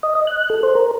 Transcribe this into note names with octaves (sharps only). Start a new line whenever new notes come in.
D#5
D#5
F#6
A4
C5
A#4